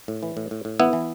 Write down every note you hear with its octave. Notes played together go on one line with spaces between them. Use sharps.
A2
E3
A2
A2
A2
E3 B3 E4
E3